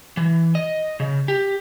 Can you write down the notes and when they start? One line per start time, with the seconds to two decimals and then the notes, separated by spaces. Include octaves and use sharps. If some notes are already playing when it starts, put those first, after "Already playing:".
0.17 E3
0.55 D#5
1.00 C#3
1.28 G4